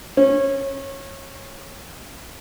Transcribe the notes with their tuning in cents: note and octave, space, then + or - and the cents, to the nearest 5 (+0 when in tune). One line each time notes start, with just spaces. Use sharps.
C#4 -25